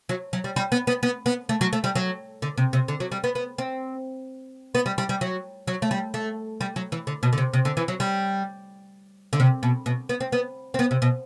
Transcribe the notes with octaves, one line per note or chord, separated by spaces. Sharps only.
F#3
F#3
G3
G3
B3
B3
B3
B3
A3
F#3
A3
G3
F#3
D3
C3
C3
D3
F#3
G3
B3
B3
C4
B3
G3
G3
G3
F#3
F#3
A3
G3
A3
G3
F#3
E3
D3
B2
D3
C3
C3
D3
E3
F#3
G3
D3
C3
B2
B2
B3
C4
B3
C4
B3
C3
B2